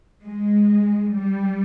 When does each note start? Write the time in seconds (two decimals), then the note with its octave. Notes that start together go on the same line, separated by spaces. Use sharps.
0.23 G#3
1.13 G3